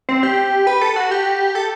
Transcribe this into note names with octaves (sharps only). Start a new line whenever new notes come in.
C4
G4
B4
A4
F#4
G4
A4